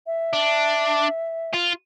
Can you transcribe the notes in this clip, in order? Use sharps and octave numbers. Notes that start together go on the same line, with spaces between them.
E5
D4
F4